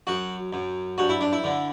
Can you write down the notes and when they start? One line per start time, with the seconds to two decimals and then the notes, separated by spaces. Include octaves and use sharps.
0.07 F#2 F#4
0.53 F#2
0.98 G2 F#4
1.09 E4
1.21 D4
1.33 E4
1.44 D3